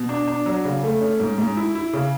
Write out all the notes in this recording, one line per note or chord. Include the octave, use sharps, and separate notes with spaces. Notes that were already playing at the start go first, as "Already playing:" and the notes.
Already playing: B2
D4
D4
F#3
C#3
A3
C#4
G#2
G#2
E4
E4
C#3